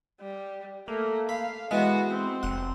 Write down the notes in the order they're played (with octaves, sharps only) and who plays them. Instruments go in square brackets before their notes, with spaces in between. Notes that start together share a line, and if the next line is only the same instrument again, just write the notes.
[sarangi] G3
[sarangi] A3 [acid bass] A#3
[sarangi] F5 [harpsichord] B5
[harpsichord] E3 G#3 [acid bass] B3 [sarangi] F#4
[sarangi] C4
[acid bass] F1 [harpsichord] F#5